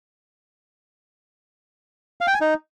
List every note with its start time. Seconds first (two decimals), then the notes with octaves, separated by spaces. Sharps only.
2.21 F5
2.27 G5
2.34 G#5
2.41 D#4